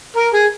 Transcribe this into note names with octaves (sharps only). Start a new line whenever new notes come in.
A#4
G#4